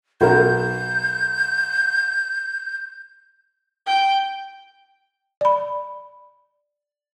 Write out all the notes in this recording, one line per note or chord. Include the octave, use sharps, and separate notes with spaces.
B1 A#4 G6
G5
D5 B5